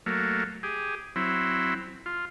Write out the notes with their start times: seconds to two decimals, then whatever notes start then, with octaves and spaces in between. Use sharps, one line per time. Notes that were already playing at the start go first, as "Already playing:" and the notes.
0.06 F#3 A3 A#3
0.63 G4 G#4
1.16 F#3 C4 E4
2.06 F4